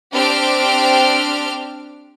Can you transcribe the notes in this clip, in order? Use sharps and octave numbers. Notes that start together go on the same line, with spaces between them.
C4 D4 G4 G5 F6 D7